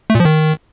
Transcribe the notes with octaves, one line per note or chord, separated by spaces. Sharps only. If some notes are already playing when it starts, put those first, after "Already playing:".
A3
A#2
F3
D#3